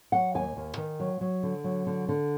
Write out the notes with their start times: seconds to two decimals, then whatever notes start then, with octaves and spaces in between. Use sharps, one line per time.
0.12 F#3 F#5
0.34 D#2 G#5
0.57 D#2
0.77 D#3
1.00 F#3
1.21 F#3
1.43 D3
1.64 F#3
1.87 D3
2.09 D3